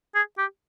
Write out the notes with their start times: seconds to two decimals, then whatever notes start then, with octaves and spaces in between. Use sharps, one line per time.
0.15 G#4
0.38 G4